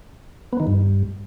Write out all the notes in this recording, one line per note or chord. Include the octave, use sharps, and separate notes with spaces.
B3
D#3
G2